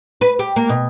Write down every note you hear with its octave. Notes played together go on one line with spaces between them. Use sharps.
B4
G4
A#3
B2